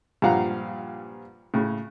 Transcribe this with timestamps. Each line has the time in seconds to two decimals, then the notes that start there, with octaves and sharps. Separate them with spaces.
0.22 G2 A#2 F3 F5 F#5 A#5
1.54 A2 C#3